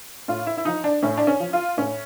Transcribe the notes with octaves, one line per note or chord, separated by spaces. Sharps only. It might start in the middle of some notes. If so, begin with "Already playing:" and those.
A2 F4
E4
E4
F3 D#4
D4
A2 C#4
D4
C#4
F3
F4
A2 C#4